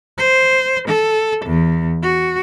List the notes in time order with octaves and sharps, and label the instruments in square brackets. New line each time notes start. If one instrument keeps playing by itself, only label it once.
[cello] C5
A4
E2
F#4